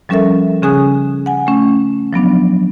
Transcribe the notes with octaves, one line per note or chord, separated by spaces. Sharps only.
F3 G3 C#4 A4 A#4 E5
C#3 C#4 G#4 G#5 D#6 F#6
F#5 G#5
A3 C#4
F3 F#3 B3 D4